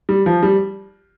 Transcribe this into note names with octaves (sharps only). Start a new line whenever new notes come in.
G3
F3
G3